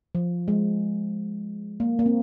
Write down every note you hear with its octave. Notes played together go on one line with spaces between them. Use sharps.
F3
G#3
A#3
A#3
C4